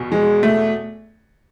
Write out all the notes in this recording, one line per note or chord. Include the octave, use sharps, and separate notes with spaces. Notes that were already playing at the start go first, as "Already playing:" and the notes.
Already playing: E2 B2
G#3
A3